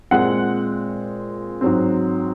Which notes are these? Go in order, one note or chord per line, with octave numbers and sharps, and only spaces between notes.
A#2 G#3 C4 F#5
G#2 F#3 C4